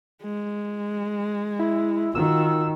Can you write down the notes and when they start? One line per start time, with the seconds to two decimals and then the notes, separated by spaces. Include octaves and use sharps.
0.23 G#3
1.59 E4
2.15 D#3 F4 F#4 E6